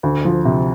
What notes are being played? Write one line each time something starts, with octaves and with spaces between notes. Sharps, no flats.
D2
F3
C3